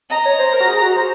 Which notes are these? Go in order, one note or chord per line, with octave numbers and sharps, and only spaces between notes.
D#5 A#5
C#5
C5
A#4
F#4
G#4
F#4
C5